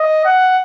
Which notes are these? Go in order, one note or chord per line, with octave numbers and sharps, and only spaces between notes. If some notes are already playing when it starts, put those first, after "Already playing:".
Already playing: D#5
F#5